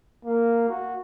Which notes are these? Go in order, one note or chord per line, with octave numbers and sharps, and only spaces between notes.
A#3
F#4